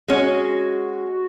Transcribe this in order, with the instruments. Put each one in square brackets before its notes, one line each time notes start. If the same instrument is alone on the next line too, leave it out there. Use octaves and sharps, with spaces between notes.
[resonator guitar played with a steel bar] G#3 C#4 [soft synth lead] F#4